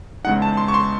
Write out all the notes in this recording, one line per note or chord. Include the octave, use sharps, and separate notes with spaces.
E2 C#3 G#3 D#4 F#5
A5
C6
C#6
C6